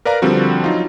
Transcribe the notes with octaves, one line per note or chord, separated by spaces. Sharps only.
A#4 B4 D5 F5 A#5
D3 F3 G3 C4 F#4
F#3 D#4 F4